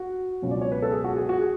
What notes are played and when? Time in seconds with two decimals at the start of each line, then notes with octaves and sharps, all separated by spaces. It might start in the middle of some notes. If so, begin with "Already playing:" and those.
Already playing: F#4
0.42 C#2 B2 F#3 C#4
0.51 D5
0.61 C#5
0.72 B4
0.82 A4
0.92 G#4
1.04 F#4
1.17 G#4
1.29 F#4
1.41 G#4